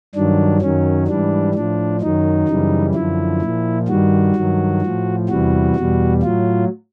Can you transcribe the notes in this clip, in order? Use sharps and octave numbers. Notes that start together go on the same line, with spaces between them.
G2 D#3 F#3 D4
F#2 D#3 F#3 C#4
G#2 E3 G3 D4
A2 F3 D4
F#2 D#3 F#3 D#4
F#2 C#3 E3 G3
F#2 D3 F3 E4
A#2 F3
G2 D#3 G3 F#4
G2 D#3 F#3
A2 F3
E2 C3 E3 G3 F#4
E2 B2 G3
A2 F#3 F4